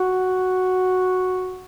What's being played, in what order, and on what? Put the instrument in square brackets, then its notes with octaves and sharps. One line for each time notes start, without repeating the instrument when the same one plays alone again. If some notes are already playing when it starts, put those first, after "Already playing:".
Already playing: [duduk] F#4